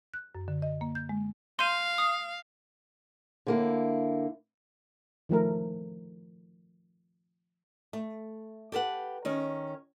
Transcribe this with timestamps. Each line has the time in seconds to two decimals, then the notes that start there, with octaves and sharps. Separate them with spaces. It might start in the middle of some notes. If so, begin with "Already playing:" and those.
0.14 F#6
0.35 F#2
0.48 D3
0.62 D#5
0.81 A#3
0.95 G6
1.09 G#3
1.59 F5 C6 G6 D#7
1.98 D#6 C7
3.47 D3 A#3 E4
5.29 D#3 F3 A3 A#4
7.93 A3
8.72 G4 A4 B4 F#5
9.25 D#3 C#4